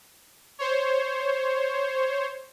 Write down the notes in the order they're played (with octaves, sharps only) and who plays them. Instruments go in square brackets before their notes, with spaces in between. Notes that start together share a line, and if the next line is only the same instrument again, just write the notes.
[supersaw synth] C5 C#5